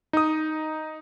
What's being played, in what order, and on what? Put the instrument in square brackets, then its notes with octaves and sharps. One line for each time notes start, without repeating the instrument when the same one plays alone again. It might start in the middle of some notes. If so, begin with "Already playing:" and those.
[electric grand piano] D#4 D#6